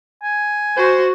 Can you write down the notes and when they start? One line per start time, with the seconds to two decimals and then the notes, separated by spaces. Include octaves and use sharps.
0.23 G#5
0.77 F#4 C5